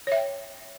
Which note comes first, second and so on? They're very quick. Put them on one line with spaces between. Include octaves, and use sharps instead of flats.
C#5 E5 G5